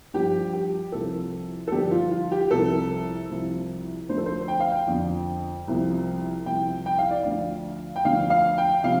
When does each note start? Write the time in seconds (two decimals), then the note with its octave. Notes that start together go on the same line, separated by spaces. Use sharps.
0.14 G2 F3 G4
0.53 G4
0.92 C2 C3 F3 A4
1.68 A4
1.72 G2 D3 F3 G4
1.91 F4
2.11 F4
2.32 G4
2.51 C2 C3 F3 A4
3.30 C2 C3 F3
4.09 D2 D3 F3 C5
4.18 A4
4.26 C5
4.48 G5
4.60 F5
4.72 G5
4.88 F2 D3 F3
5.68 C2 C3 F3
6.46 C2 C3 F3 G5
6.86 G5
6.99 F5
7.11 D5
7.23 D2 D3 F3 F5
7.96 G5
8.05 D2 D3 F3 F5
8.30 F5
8.58 G5
8.84 C3 F3 F5